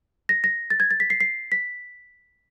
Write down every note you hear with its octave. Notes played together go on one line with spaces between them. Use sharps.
A#6
A#6
A6
G#6
A6
B6
C7
C7
B6